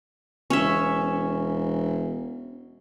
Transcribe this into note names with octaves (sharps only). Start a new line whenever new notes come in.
E1 C#4 E5